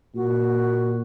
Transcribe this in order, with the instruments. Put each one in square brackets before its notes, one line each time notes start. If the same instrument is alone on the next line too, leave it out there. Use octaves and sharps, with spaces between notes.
[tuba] A#2 [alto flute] F#4